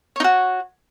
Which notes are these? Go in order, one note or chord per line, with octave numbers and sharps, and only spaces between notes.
D#4 F#4 C#5